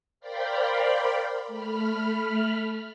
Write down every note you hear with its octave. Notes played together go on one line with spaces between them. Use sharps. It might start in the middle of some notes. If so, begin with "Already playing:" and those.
A#4 C5 D5 F5 G5 B5
A3 B5 F6